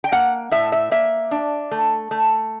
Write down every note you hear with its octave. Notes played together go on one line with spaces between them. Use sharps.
G5
A#3 F#5
A2 E5
E5
A#3 E5
D4
A3
A3